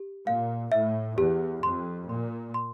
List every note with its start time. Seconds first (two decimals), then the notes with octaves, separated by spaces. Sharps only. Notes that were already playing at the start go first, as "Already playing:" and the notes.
Already playing: G4
0.26 A#2 F5
0.72 A2 E5
1.18 E2 G4
1.63 F2 C6
2.09 A#2 C6
2.54 C6